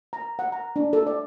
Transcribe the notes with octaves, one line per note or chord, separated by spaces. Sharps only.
A#5
F#5
A#5
D4
A4
D5